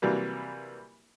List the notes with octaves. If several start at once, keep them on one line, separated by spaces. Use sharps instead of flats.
C3 E3 F#3 G3 A#3